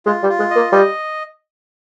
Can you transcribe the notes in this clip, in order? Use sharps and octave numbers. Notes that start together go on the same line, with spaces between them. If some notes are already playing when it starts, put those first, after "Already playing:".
G#3 F4
G3
F4
G#3
D#5
A#3
G3 D#5